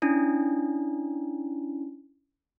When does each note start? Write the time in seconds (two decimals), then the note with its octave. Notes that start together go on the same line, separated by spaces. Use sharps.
0.02 C#4 D4 E4